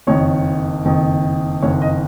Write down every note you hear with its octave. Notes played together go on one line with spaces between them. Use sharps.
F#1 F2 D#3 C#5
F#1 F2 D#3
F#1 F2 D#3 C#5
D#5